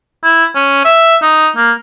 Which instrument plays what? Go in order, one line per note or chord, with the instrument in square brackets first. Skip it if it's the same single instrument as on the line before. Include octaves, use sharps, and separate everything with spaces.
[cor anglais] E4
C#4
E5
D#4
A#3